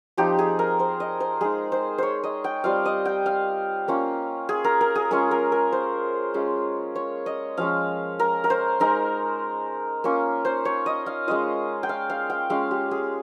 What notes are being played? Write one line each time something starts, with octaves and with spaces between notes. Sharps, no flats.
F3 C4 D#4 G4
G#4
A#4
C5
D#5
C5
G#3 D#4 G#4
C5
C5 C#5
D#5
G5
G3 C4 F4 F5
D#5
G5
F5
A#3 C#4 F4
G#4
A#4
A#4
G#4
G#3 C#4 F4 A#4
A#4
A#4
C5
G#3 C#4 F4
C#5
D#5
F3 G#3 C#4 F5
A#4
A#4
C5
G#3 D#4 A#4
A#3 C#4 F4
C5
C#5
D#5
F5
G#3 C#4 F4 D#5
G5
F5
F5
G5
G#3 C#4 F4 F5
G4
G#4